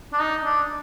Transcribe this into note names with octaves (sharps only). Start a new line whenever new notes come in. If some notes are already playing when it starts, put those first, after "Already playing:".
D4
D#4
D4